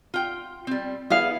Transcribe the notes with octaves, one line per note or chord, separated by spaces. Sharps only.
F4 G5
G3 C4
B3 E4 G#4 F5